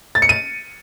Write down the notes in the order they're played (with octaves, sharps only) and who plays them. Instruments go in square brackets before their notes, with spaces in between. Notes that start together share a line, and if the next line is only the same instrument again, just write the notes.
[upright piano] A6
C#7
D#7